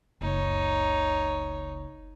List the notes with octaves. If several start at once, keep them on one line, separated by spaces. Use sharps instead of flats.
F#1 C#2 D#4 C#5